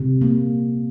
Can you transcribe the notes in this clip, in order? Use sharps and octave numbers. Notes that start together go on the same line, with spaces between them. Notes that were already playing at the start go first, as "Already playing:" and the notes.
Already playing: C3
A#3